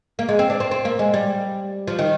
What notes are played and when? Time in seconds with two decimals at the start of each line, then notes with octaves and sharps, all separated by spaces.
0.19 A#3
0.29 G#3
0.39 C4
0.50 D4
0.60 C4
0.71 C4
0.85 A#3
0.99 G#3
1.14 G3
1.88 F3
1.99 D#3